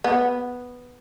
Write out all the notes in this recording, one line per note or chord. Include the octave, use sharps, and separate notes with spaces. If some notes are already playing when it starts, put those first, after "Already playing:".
B3